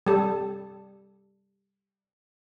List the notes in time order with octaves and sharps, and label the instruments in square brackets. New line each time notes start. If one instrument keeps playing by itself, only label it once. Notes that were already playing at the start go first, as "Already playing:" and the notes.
[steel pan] G3 A4